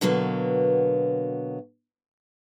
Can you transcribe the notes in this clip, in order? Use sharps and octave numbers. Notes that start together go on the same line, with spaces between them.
B2 D3 F#3 A#3 B3